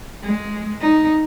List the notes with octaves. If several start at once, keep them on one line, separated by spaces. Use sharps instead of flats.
G#3
D#4